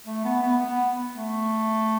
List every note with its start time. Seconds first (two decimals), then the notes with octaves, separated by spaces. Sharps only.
0.07 A3
0.24 B3
0.42 B3
0.60 B3
1.15 A3